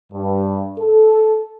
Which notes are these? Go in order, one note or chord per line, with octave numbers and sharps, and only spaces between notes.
G2
A4